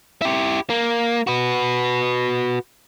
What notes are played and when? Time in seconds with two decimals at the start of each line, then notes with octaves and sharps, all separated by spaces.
0.22 E4 G4
0.70 A#3
1.27 F#4 B4